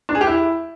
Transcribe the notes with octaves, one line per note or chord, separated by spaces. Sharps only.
D4
G#4
G4
E4